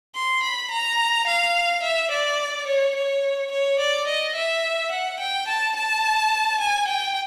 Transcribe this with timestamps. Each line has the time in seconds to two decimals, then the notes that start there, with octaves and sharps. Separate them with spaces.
0.15 C6
0.43 B5
0.71 A#5
1.27 F5
1.83 E5
2.11 D5
2.67 C#5
2.96 C#5
3.52 C#5
3.79 D5
4.07 D#5
4.36 E5
4.91 F#5
5.20 G5
5.48 A5
5.76 A5
6.60 G#5
6.87 G5